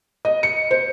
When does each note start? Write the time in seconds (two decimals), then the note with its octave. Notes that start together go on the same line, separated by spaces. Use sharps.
0.25 D#5
0.43 C#7
0.71 C5